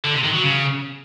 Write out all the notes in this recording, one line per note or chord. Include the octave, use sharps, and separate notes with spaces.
D3
C3
D#3
F#3
C#3